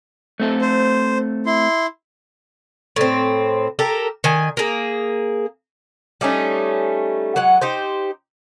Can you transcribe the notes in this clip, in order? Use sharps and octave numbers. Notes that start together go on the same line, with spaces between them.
A3 C4 A4
C5
E4 C6
A2 C4
G4 A4 A#4
D#3 G#5
A#3 G#4
G3 A3 C#4 D#4
F#3 G#3 F#5
D#4 G4 C5